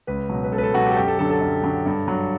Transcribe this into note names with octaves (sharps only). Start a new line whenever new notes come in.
C#2 B4
B2 F#3
B4
C#2 A4
B4
A4
B2 F#3 F#4
G4
A4
F#2 G4
A4
D3 F#3 A4
A4
F#2
D3 F#3
G2
F#3